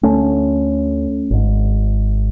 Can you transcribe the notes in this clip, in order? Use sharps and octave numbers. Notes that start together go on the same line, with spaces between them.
D2 D3 A3 C#4
G#1 G#2